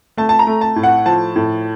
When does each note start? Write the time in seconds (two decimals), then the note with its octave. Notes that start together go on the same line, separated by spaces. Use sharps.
0.17 A3 A5
0.29 A5
0.39 A#5
0.47 A3
0.61 A5
0.76 A2
0.83 F#5
1.06 F3 A5
1.36 A2